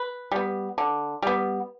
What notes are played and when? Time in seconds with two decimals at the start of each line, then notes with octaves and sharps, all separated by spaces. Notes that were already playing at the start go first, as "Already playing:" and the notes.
Already playing: B4
0.32 G3 B3
0.78 D3
1.22 G3 B3